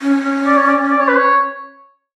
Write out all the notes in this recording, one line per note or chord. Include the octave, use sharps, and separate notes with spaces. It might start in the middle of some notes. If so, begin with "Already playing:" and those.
C#4
D5
C#5
D5
D5
C#5
B4
C#5